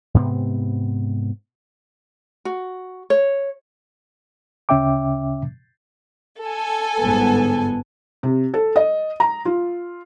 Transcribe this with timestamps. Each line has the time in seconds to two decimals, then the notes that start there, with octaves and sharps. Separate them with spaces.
0.14 G#2 C3 B3 C4
2.45 F#4
3.10 C#5
4.69 D2 C#3 C#4 E5 G5 D6
6.43 A4 G#5
7.01 G1 G#2 B3
8.23 C3
8.54 A4
8.76 D#5
9.20 A#5
9.45 F4